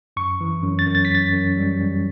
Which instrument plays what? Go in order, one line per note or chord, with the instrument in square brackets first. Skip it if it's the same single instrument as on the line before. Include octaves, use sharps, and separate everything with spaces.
[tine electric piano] F#2 C#6
E3
F#2
A6
F#2
A6
B6
F#2 A6
F#2
G3
G3